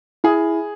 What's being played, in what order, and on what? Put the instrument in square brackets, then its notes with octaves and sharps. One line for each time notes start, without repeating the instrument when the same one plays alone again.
[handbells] E4 [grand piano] G#4